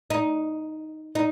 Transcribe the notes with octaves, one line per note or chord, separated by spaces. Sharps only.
D#4
D#4